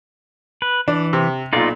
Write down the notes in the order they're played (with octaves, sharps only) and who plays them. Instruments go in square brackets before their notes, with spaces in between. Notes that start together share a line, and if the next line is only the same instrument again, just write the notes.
[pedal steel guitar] B4
[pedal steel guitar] E3 [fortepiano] D4
[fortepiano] C3
[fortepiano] B1 A#2 [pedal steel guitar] D#4 F4 D5